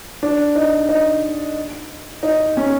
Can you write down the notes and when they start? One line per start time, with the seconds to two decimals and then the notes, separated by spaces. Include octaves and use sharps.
0.23 D4
0.55 D#4
0.89 D#4
2.23 D#4
2.57 C#4